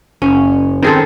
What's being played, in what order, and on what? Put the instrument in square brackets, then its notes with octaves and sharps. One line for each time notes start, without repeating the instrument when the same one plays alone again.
[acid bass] F#1 [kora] C#4
[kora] D#3 G#4 A4 [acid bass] C4